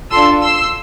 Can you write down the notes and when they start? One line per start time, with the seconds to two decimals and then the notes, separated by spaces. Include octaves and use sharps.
0.10 D4 F4 A4 C6 E6
0.42 C6 E6